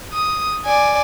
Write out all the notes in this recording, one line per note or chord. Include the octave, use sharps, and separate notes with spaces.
D#6
D5 G#5